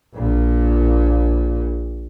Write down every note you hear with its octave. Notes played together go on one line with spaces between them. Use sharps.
A#1 A#2